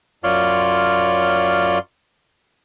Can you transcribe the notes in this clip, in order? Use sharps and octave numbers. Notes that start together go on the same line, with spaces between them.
F#2 F4 C#5 D5 C6 F6